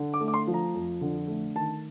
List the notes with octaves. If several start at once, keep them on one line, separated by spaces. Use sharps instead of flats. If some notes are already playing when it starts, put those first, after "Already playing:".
Already playing: D3
D6
A3
D6
C6
F3
A#5
F2
D3
A3
D#3 A5